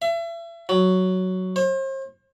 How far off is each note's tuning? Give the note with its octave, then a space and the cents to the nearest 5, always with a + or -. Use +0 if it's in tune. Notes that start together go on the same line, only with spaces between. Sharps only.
E5 +35
F#3 +5
C5 +40